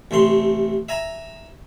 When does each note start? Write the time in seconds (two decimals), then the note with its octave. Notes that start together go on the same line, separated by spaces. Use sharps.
0.11 A1 C3 A3 C6
0.89 E5 G#5 A#5